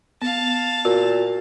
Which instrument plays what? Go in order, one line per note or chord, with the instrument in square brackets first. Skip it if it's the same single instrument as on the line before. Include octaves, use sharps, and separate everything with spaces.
[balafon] B3 [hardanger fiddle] F5 A5
[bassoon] A#2 [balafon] F#4